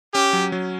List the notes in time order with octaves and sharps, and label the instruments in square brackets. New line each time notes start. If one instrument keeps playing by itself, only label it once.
[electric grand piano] C#4 [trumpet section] G4
[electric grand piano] F#3
F#3